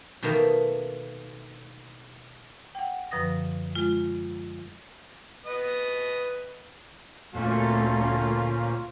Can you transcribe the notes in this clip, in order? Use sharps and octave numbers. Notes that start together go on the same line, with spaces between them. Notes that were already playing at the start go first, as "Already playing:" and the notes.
B2 D#3 A3 A#3
F#5 G5
F#2 D3 F3 B4 D#6 A#6
G#3 F4
B4 D#5 D#6
D2 A#2 A3 A#3 C4 C#4 F4 A4